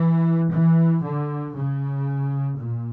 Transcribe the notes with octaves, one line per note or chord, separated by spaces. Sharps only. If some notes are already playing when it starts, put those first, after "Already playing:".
Already playing: E3
E3
D3
C#3
A#2